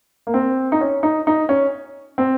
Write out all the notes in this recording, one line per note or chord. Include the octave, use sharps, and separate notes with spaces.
A#3
C4
D#4
C#4
D#4
D#4
C#4
C4